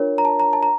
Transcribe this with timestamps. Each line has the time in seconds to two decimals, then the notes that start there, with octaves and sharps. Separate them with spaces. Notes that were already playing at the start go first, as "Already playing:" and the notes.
Already playing: D4 F4 A#4 C#5
0.18 A#5
0.25 A5
0.40 A#5
0.53 A5
0.63 A#5